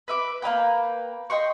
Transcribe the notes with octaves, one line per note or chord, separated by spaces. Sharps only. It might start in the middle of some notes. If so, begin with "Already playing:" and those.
B4 E5 D6
A#3 C#4 B4 G5
D#5 G5 C6 C#6